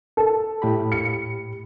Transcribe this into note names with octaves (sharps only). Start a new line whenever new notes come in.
A4
A2 G4 B5
C#7